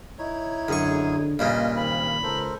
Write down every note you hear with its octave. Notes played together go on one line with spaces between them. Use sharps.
D#4 E4 C#5
F#2 D3 G#4 C#6
G2 A#2 C#3 A#3 D#5
D#3 C4 B5
C#2 A4 A#4 C5